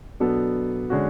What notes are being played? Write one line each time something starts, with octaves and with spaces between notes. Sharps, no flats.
B2 F#3 B3 D4 A4
D3 G#3 C#4 F#4